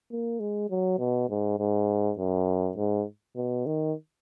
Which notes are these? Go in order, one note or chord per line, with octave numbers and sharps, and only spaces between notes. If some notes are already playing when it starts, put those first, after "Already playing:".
A#3
G#3
F#3
B2
G#2
G#2
F#2
G#2
B2
D#3